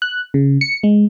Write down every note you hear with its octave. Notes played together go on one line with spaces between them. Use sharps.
F#6
C#3
C#7
G#3